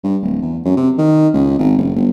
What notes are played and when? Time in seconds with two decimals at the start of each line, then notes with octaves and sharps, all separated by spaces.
0.04 G2
0.22 D1
0.42 E2
0.65 F#2
0.77 C3
0.98 D#3
1.33 C#2
1.59 G#1
1.78 F#1
1.96 G1